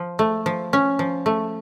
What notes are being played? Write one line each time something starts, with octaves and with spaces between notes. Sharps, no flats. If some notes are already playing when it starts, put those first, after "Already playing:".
Already playing: F3
A3
F3
C#4
F3
A3